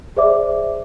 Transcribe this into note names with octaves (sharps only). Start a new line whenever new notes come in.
G#4 C5 D5 E5 D6